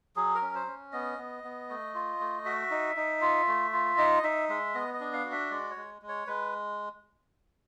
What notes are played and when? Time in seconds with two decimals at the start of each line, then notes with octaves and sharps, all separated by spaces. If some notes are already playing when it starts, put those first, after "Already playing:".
0.16 F#3 G#4
0.35 A#4
0.42 C#4
0.55 C5
0.67 C#4
0.92 B3 D#5
1.18 B3
1.44 B3
1.69 A3
1.95 F4
2.20 A3
2.45 F#4 E5
2.71 D#4
2.96 D#4
3.21 F4
3.47 A3
3.73 F4
3.98 D#4 D#5
4.23 D#4 E5
4.49 G#3 E5
4.75 B3 D#5
4.94 D#5
5.00 D4
5.13 F5
5.25 F#4
5.32 E5
5.51 G#3 D5
5.70 C#5
5.76 G#3
6.02 G#3
6.09 C#5
6.27 G#3 B4